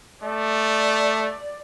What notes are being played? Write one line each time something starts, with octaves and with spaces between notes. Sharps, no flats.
A3 D5